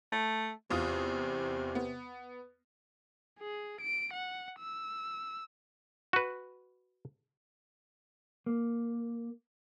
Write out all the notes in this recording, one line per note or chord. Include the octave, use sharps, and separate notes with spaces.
A3
E2 C3 F4 D#6
B3
G#4
D7
F#5
E6
F#4 B4
A#3